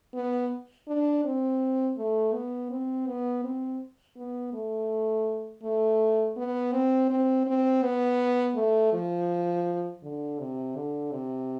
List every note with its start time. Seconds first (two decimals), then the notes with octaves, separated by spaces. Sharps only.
0.14 B3
0.88 D4
1.25 C4
1.98 A3
2.33 B3
2.71 C4
3.07 B3
3.44 C4
4.17 B3
4.53 A3
5.63 A3
6.37 B3
6.73 C4
7.10 C4
7.46 C4
7.83 B3
8.55 A3
8.93 F3
10.03 D3
10.39 C3
10.75 D3
11.12 C3